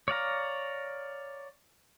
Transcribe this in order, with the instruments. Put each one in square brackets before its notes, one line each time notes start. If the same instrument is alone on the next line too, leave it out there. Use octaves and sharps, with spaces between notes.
[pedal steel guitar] C#5 D5 F5 A#5